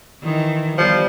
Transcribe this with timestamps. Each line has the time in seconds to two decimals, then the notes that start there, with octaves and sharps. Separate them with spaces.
0.23 D#3 E3
0.78 E2 F3 G3